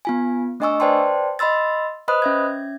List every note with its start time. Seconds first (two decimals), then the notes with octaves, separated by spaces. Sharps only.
0.05 B3 F4 G#5
0.60 A3 D4 D#5 G#5 C#6 E6
0.80 B4 C5 D5 G5 A5 C6
1.39 D#5 B5 C6 E6 A6
2.08 B4 C5 D#5 B5 D#6 F#6
2.22 C#4 E5 G#6